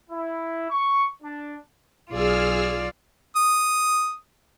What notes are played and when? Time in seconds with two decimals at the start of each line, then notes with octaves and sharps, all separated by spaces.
0.11 E4
0.70 C#6
1.22 D4
2.11 B1 F4 G#4 D5 E6 F6
3.36 D#6